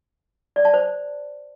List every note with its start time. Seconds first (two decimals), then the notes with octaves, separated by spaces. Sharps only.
0.56 D5
0.65 A5
0.74 C5